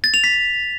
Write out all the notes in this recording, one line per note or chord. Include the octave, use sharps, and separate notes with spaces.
A6
F7
B6